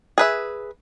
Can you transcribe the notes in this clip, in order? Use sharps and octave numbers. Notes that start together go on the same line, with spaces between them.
G#4 B4 E5